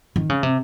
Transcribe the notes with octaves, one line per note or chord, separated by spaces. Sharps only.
D#3
C#3
C3